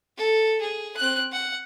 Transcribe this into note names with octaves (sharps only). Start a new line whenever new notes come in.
A4
G#4
C4 F#6
F#5